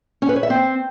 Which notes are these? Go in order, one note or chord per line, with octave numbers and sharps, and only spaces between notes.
C#4
B4
C#5
E5
C4